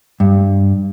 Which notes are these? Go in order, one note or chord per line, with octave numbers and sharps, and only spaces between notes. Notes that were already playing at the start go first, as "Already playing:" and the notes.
G2